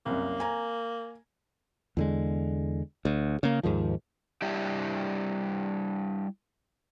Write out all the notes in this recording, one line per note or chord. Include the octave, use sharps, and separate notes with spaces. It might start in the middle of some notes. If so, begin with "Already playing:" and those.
C2 F#2 A#3
G#5 A#5
E2 D3 G#3
D2
C#3 A#3
D#2 G#2 D#3 F3
G3 D4 E4 G4 E5